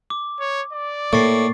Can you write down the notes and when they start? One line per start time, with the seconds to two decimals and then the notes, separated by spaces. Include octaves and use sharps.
0.10 D6
0.40 C#5
0.73 D5
1.13 A2 A#3 C#6 A6 C7